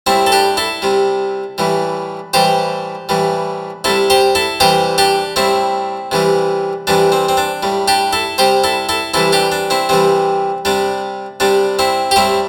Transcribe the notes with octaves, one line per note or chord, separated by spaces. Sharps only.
A2 G3 C4 E4
A4
D4 G4
E4 A4
C3 G3
A2 E3 G3
A2 E3 G3 G4 C5
A2 E3 G3
C3 G3 E4 A4
G4 C5
E4 A4
C3 E3 G3 G4 C5
D4 G4
A2 G3 C4 E4
C3 E3 G3
C3 E3 G3 D4
C4
C4
D4
A2 G3
D4 G4
E4 A4
C3 G3 G4 C5
E4 A4
E4 A4
C3 E3 G3 E4 A4
D4 G4
D4
C4 E4
C3 E3 G3 C4
C3 G3 D4
C3 G3 D4
C4 E4
G4
A2 G3 C4 E4